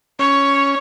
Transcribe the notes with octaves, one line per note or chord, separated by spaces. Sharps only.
C#4 C#5